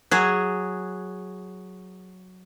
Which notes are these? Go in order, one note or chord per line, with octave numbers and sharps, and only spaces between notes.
F#3 G#4